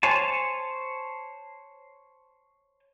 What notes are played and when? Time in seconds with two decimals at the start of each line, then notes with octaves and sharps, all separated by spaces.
0.03 C5 C#5 G#5 A5